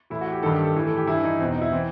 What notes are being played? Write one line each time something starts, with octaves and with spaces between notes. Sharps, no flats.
A2 E3 E4
F#4
G4
G2 D#3 A4
G4
A4
A2 E3
A4
G4
G2 E3 E4
D#4
E2 B2 C4
D#4
E4
E3 C4